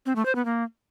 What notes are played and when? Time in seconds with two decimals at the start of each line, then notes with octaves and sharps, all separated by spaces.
0.06 C4
0.16 A3
0.26 C5
0.35 B3
0.45 A#3